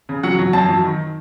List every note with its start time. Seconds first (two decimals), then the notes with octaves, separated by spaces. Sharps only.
0.09 C#3
0.23 F#3 F#5
0.39 F#3
0.53 F#2 A5
0.69 F#3
0.84 D#3